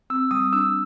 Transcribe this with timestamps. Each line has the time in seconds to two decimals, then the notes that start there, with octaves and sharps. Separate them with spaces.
0.10 C4 E6
0.31 G3 D#6
0.53 D4 E6